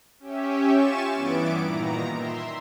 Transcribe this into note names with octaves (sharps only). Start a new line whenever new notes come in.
C#4 G4 E5
F4 G#5 C#6 A6 E7
G2 E3 B3 E4 D6 D7
A#2 D#3 A#5
E5 C6